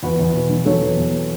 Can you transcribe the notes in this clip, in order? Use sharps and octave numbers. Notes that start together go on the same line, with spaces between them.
E2 F#4 B4
E2
B2
F#3
F#3 A4 C#5
E2
E2